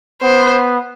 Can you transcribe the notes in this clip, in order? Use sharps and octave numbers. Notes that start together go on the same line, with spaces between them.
B3 C5